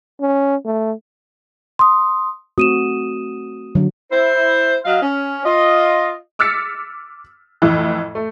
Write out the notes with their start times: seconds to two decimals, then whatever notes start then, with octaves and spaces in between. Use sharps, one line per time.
0.21 C#4
0.65 A3
1.79 C6 D#6
2.58 A3 C4 F#4 D#6 D#7 E7
3.75 D3 F#3
4.12 E4 C5
4.85 F#3 D#5 F5
5.02 C#4
5.45 F4 D#5
6.39 D6 E6 F6 A6 B6 C#7
7.62 F2 A2 E3
8.15 A3